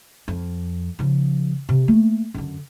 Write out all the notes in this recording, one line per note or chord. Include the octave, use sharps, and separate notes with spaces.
F2
C#3 F3
C3
A3 A#3
F#2 D3